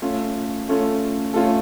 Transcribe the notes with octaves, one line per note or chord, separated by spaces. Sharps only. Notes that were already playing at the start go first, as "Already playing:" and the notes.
A3 C#4 F4 A4
A3 C#4 F4 A4
A3 C#4 F4 A4